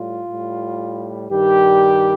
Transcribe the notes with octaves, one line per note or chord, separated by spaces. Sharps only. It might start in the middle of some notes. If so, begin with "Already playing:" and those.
Already playing: A2 G3 F4
A2 G3
G2 D#3 G3 G4